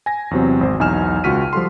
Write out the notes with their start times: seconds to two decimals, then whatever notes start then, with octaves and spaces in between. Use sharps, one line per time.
0.06 G#5 A#6
0.31 E2 C3 F#3 C4
0.61 G#1 C5
0.79 B1 E2 D#4 G#5 F6 E7
1.24 C#2 F4 F#4 F6 B6 D#7
1.53 F3 G3 A4 C6